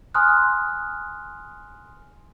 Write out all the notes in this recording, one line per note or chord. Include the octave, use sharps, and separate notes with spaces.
G#5 A#5 C6 D#6 F6 F#6